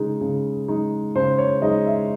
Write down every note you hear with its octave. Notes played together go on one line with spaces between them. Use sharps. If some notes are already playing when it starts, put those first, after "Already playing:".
Already playing: C#3 G#3 D#4
C#3
G#3 D#4
C#3 C5
C#5
G#3 D#4 D#5
E5